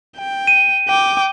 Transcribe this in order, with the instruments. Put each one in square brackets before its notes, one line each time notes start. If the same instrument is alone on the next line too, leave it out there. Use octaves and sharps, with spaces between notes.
[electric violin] G5
[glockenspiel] D#7
[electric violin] G5 D6